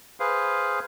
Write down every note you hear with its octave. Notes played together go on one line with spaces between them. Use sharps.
G#4 B4 C5 F5